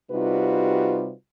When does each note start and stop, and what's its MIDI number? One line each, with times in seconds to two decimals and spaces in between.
0.11 1.12 48
0.11 1.12 55
0.11 1.12 63
0.11 1.12 65
0.11 1.12 66
0.11 1.12 71